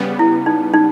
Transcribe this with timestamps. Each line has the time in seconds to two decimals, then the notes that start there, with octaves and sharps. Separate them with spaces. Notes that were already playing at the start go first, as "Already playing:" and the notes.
Already playing: C#3 G3 B3
0.19 E4
0.46 D#4
0.74 D#4